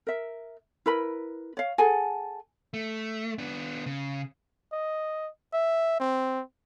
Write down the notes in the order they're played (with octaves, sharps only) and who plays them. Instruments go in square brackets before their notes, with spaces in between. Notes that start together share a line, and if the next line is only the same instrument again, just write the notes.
[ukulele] A#4 E5
E4 A#4 B4 B5
C#5 F5
G#4 A4 F#5 G#5
[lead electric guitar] A3
B3 D4
C#3
[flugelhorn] D#5
E5
C4